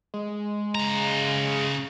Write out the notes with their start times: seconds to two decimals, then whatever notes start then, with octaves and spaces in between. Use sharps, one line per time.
0.14 G#3
0.75 C#3 A#5